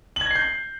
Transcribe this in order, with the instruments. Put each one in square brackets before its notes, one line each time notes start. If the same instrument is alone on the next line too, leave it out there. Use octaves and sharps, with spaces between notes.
[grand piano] F#7
G#6
A#6
C7
G6